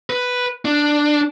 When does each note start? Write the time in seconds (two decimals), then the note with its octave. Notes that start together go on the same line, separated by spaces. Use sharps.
0.10 B4
0.65 D4